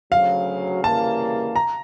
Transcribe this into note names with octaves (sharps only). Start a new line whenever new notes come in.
D2 C#3 F#3 F5
C#3 E3 G3 A#3 A5
A#5